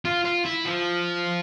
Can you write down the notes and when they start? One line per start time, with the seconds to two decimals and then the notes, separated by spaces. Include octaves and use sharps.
0.05 F4
0.25 F4
0.45 E4
0.65 F3